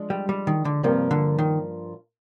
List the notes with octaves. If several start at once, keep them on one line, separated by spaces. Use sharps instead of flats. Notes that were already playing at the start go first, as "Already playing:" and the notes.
Already playing: F3 G#3 D4
G3
G3
D#3
D3
G2 C3 F3 A#3 F4 A#4
D3
D#3